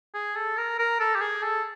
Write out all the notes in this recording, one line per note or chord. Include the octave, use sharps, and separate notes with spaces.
G#4
A4
A#4
A#4
A4
G4
G#4
A4